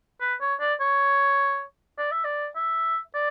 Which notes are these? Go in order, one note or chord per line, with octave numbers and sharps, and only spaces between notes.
B4
C#5
D5
C#5
D5
E5
D5
E5
D5